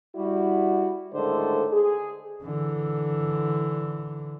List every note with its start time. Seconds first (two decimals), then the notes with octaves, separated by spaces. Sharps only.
0.15 G3 E4 F#4
1.14 A2 D3 D#3 G#3 A4 C5
1.73 G#4
2.44 D3 E3